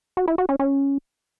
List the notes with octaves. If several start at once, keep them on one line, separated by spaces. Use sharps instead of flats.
F#4
E4
F#4
C#4
C#4